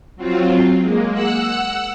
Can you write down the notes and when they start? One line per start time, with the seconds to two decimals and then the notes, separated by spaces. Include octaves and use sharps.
0.16 F#3 C4 F4
0.81 G#3 A#3
1.13 F#5 E6 F#6